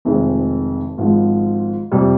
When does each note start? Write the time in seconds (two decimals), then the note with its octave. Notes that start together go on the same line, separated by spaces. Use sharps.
0.05 F1 F2 D#3 G#3
0.97 G#1 G#2 F3
1.92 F2 C3 G3